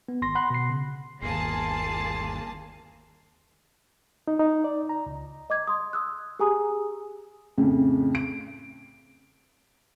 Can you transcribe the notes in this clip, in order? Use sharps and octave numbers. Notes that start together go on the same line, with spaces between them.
B3
G#1 C6 A#6
F#5 B5 C6 F#6
B2 C7
C#3
G1 D#2 A#3 G#4 A5 C6
D#4
D#4
D5
A#5
C#2
D#5 D6 G#6
C6 D#6
D#6 E6 F#6
G4 G#4 G#5 A#5 D#6
F2 A2 C#3
D7